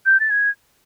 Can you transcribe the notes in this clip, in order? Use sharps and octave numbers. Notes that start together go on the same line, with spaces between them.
G6
A6
G#6